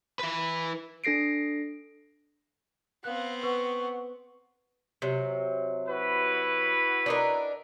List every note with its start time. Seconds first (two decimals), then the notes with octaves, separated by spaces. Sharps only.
0.20 E3 B4
1.04 D4 A4 A#6 C7 D7
3.04 B3 C4 F5 F#6
3.43 B4 F#5 C#6
5.02 C3 F#3
5.88 E4 F#4 B4
7.06 D4 D#4 A#4